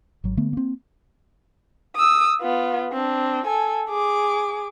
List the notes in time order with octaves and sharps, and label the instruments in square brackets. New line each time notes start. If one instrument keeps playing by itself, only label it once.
[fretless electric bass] G#1 F#3
D3 A3 B3
A#3 C4
[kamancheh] D#6 E6
B3 F4
C4 D4
A4 G#5
G#4 D6